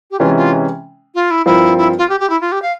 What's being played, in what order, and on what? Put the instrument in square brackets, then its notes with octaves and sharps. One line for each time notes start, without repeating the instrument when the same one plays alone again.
[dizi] G4
[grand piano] C3 E3 G#3 C#4 [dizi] F4
[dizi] F4
F4
E4
[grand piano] G2 F3 C4 F4 A#4 [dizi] E4
[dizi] E4
F4
G4
G4
E4
F4
G4
F5